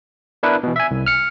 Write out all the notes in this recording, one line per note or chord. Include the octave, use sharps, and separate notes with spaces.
B3 D4 E4 A#4 B4
B2 E3
E5 G#5
C2
F6 C#7